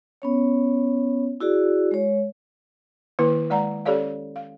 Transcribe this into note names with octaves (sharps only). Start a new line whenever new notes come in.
B3 C#4 C#5
E4 F#4 G#4 D5
G#3 C#5
D#3 A#3 E4 B4
G#3 D5 F#5 A#5
C#4 G4 A4 C#5 D5 F5
F5